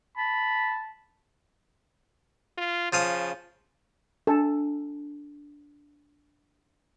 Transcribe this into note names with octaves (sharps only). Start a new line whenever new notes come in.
A5 B5
F4
C#3 F3 F5 D#6
D4 A4